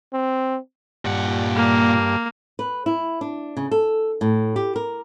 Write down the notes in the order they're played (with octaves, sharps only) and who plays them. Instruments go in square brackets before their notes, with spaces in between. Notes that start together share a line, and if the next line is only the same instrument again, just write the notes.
[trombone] C4
[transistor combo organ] G2 [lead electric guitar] A#2 F#5
[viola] A#3
[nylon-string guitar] B4
E4
D4
C#3
A4
A2
G4
A#4